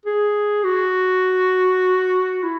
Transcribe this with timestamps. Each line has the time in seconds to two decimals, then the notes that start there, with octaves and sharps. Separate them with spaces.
0.06 G#4
0.64 F#4
2.43 E4